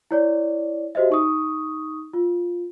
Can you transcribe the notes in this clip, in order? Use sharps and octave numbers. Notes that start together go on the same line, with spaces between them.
E4 C#5 D5
F#4 G4 C5 D#5 E5
D#4 C#6 D#6
F4